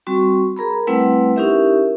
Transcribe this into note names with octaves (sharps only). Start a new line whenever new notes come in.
G3 C4 F#4 C#6
G#4 A#4 A#5 B5
G3 A3 C4 E4 B4 F#5
C#4 D#4 E4 G4 A#4 E5